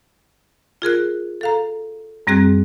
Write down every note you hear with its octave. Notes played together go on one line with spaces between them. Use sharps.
F4 G#4 A#4 F#6
A4 F5 A#5
F#2 G3 C4 G#4 F#6